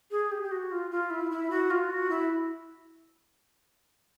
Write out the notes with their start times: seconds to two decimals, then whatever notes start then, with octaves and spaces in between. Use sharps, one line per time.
0.11 G#4
0.32 G4
0.43 G4
0.51 F#4
0.72 F4
0.91 F4
1.10 E4
1.31 E4
1.51 F#4
1.71 F4
1.90 F#4
2.10 E4